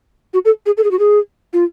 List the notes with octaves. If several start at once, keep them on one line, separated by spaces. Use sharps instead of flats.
F#4
A4
G#4
A4
G#4
F#4
G#4
F4